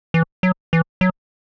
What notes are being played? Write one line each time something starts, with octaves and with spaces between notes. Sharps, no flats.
E3
F#3
E3
F#3